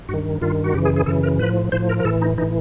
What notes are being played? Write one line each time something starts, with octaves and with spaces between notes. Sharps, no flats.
G2 D#3 F#4
G2 D#3 F4
F#4
F#2 C#3 E3 G4
G#4
G#4
F#2 C#3 E3 A4
A#4
A2 F3 B4
A2 F3 C5
A#4
A#4
A2 E3 A4
D#4
A2 E3 D#4